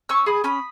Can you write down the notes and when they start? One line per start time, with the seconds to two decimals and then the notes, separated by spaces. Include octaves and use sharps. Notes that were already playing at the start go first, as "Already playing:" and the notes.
0.09 C#4 C#6 E6
0.26 G#4 B5 D#6
0.44 C#4 B5 D#6